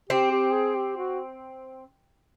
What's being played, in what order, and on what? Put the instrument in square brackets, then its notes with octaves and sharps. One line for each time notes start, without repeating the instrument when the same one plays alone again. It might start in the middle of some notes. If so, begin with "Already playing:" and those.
[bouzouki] C4 [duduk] G4
[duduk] G4
G#4
G4
F#4